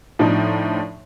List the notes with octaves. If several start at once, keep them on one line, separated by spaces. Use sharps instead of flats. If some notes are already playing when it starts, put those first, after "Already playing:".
A2 F3 D4 D#4